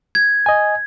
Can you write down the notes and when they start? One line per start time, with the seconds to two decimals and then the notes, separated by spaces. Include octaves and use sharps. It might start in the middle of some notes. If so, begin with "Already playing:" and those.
0.15 G#6
0.46 D#5 G#5